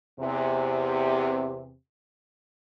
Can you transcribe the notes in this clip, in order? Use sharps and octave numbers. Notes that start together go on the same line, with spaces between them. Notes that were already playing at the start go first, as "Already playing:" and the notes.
E2 C3